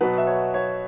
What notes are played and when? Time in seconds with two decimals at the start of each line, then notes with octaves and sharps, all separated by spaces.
0.01 B2 F#3 B3 B4
0.18 E5
0.27 C#5
0.54 C#5